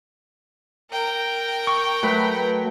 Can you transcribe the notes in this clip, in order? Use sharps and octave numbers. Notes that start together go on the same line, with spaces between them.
A#4 G5
C#6
F#3 A3 B4